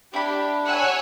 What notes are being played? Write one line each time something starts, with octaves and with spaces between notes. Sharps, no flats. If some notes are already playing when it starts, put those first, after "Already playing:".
D4 E4 G4 B5
C#5 F#5 G#5 E6 F#6